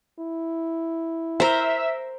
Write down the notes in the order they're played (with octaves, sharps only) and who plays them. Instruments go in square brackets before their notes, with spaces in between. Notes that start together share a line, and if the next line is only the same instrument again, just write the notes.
[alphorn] E4
[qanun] A#4 C5 [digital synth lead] E5